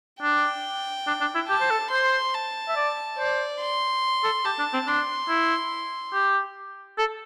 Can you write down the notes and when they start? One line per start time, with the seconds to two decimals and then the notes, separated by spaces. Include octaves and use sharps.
0.22 D4 G5
1.07 D4
1.21 D4
1.35 E4
1.49 G4 A5
1.61 C5
1.71 A4
1.91 C5 C6
2.34 A5
2.68 E5
2.76 D5
3.18 C5 D5
3.61 C6
4.24 A4
4.45 G4 A5
4.59 D4
4.73 C4
4.87 D4 C6
5.29 E4
6.14 G4
6.98 A4